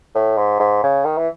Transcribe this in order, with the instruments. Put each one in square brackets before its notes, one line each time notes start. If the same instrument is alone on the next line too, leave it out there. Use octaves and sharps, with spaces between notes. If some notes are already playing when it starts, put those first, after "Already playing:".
[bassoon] A2
G#2
G#2
C#3
D#3
E3